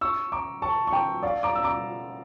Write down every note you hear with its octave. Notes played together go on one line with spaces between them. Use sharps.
C#6 E6
A#5 D6
A5 C#6
C#6
G5 A#5
D5 F5
A#5 D6
E6
A#5 D6